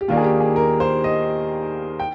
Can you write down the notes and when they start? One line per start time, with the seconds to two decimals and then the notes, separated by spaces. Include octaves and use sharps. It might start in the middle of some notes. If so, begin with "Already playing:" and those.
0.01 G4
0.08 D#2 D#3 A#3 D4 F4
0.17 G#4
0.24 G4
0.40 G#4
0.56 A#4
0.80 C5
1.04 D#5
2.00 G5